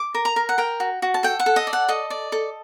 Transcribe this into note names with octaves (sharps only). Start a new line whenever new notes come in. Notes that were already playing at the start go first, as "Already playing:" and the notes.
Already playing: D6
A#4
A#5
A#4
F#5
A#4 G5
F#4
F#4
A5
A4 G5
F#5
A4
D#5
D5
F#5
A4 D#5
D5
A4